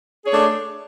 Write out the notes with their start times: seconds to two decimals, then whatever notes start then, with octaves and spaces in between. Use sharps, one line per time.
0.23 G#4
0.27 C#5
0.30 D4
0.33 A3